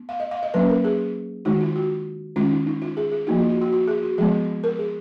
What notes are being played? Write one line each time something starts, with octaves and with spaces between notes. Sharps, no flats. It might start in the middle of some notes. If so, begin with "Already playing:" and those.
Already playing: B3
F5
D#5
F5
D#5
F#3 A#3 C#4 B4
A#4
G#4
D#3 G#3 D#4 F#4
F4
F#4
D#3 G#3 C#4 F4
D#4
D#4
F4
G#4
G#4
F3 A#3 D#4 F#4
F4
F#4
F#4
F#4
G#4
F#4
F3 G#3 B3 G#4
A#4
G#4